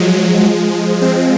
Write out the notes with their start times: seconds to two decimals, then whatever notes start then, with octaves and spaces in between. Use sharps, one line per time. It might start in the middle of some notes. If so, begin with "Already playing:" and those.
Already playing: F3 F#3 G#3
1.01 G#3 C4